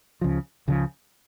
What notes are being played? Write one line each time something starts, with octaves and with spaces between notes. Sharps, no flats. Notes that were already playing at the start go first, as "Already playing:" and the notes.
C#2 C#3 F3
C#2 C#3 F3